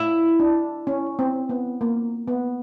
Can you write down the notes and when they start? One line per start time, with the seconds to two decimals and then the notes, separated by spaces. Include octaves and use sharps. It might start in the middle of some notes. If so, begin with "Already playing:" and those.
Already playing: E4
0.40 D4
0.87 C#4
1.19 C4
1.49 B3
1.81 A#3
2.28 B3